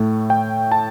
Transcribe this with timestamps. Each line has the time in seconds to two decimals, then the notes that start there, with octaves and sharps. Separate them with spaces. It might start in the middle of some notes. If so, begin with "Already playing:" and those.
Already playing: A2 A3
0.30 G5
0.72 A5